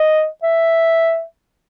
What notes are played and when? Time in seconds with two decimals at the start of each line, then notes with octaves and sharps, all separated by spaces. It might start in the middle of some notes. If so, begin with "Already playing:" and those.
Already playing: D#5
0.43 E5